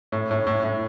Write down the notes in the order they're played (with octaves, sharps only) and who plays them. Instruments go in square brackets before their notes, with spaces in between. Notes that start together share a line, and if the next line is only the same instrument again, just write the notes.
[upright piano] A2
A2
A2
A2